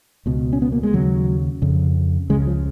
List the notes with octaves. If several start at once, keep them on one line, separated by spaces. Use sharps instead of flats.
C#2 B2
C#4
B3
A#3
G#3
D#2 C#3 F#3
F2 C#3
C#2 C#3 G#3
F3